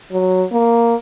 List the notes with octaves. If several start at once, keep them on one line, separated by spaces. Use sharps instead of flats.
F#3
A#3